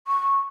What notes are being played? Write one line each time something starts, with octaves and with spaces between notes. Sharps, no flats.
C#6